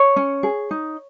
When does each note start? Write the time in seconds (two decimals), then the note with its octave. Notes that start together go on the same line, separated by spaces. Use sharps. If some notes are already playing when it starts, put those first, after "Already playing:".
Already playing: C#5
0.16 C#4
0.43 G#4
0.71 D#4